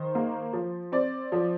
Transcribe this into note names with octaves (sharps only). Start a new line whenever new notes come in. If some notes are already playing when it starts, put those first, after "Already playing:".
Already playing: D#3 C5
A#3
F3
C4 D5
F3